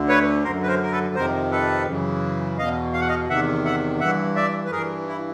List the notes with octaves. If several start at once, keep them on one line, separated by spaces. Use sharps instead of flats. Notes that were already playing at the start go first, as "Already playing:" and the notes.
Already playing: D2 D3
B4 C#5
F#2 D3 A#4 C5
B4
A#4 C5
A#4
A4 B4
F2 C3 D#3 A#4 C5
A4 B4
F#2 C#3 E3
E2 B2 D#5 F5
F5
F#5
D#5 F5
E2 C3 D#3 E5 F#5
E5 F#5
G2 E3 E5 F#5
D5 E5
B4
G2 E3 G#4 A#4
E4